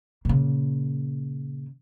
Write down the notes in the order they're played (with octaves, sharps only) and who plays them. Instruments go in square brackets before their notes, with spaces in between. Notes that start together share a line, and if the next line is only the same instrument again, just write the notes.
[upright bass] A#2 C#3